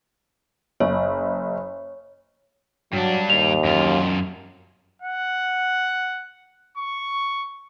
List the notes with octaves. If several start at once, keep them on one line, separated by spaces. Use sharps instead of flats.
F#1 C#5
G2 F#3 D4
D#2 F7
F#2 F4
F#5
C#6